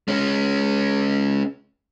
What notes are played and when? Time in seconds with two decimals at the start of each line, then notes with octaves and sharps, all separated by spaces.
0.08 G#3 C#4